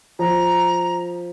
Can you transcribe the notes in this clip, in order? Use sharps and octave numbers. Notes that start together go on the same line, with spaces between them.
F3 A#5